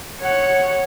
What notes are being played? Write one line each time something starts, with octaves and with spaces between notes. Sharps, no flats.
C#5 F#5